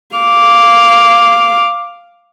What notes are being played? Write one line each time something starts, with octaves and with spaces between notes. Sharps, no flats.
F5 D6